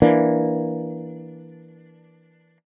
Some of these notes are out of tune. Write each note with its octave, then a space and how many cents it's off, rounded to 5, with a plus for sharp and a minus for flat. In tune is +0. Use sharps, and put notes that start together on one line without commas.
E3 +0 A#3 +10 D4 +0